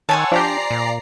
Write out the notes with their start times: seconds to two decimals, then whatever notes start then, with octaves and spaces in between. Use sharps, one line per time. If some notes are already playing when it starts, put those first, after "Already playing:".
0.09 D#3 C5 C#5 F#5 G#5 A5 E6
0.32 F3 D4 G4 D5 A#5 C7
0.71 A#2